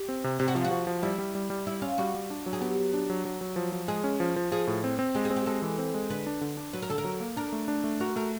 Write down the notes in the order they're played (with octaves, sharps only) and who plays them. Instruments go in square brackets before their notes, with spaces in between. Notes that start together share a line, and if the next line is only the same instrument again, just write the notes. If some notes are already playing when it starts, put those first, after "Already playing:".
Already playing: [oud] G4
[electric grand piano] C4
C3
[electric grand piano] C3 [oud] G4
[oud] F#4
[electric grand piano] F3 [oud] F4
[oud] F#4
[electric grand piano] F3
F3
[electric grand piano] G3 [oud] E4
[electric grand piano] G3
G3
G3
[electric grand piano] G3 [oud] E4
[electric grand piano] C#4 [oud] F4
[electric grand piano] G3 [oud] F#4
[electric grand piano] G3
D4
F#3
[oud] G#4
[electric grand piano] B3 [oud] G4
[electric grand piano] F#3
D4
F#3
F#3
F#3
F3
F3
[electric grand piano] G#3 [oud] G#4
[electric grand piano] C#4
F3
F3
[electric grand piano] F3 [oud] G#4
[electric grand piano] A2
C4
C4
[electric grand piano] G#3 [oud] G4
[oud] G#4
[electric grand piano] C4
[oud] G4
[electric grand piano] G#3 [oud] A4
[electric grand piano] E3
C4
G#3
[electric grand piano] D3 [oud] B4
[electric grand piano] D4
D3
D4
[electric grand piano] F#3 [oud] B4
[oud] A#4
[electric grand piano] D3 [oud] A4
[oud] A#4
[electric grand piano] F#3
A#3
[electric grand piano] D4 [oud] A#4
[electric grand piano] A3
D4
A3
[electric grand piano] F#4 [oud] A#4
[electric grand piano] A3 [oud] A#4